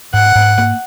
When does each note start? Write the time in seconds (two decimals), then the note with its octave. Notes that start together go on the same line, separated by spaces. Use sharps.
0.13 G#2 F#5
0.35 G#2
0.58 A#3